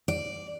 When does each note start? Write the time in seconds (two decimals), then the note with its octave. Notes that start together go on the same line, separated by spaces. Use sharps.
0.08 D5